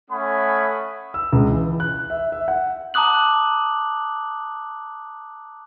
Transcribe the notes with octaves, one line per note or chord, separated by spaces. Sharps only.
A3 C#4 F#5 G#5 B5 D#6
E6
C#2
E3
F#6
E5
E5
F#5
A5 A#5 D6 D#6 F#6 F#7